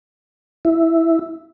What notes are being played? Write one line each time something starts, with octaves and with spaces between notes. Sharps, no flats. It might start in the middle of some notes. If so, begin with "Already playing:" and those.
E4